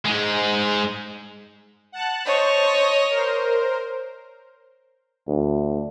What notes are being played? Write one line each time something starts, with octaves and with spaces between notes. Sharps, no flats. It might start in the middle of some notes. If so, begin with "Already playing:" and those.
G#2 G#3
F#5 A5 F#6
C5 C#5 D#5 A5 C#6
A#4 C5
D2